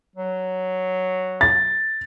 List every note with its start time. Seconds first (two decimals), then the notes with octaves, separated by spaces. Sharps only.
0.16 F#3
1.41 A6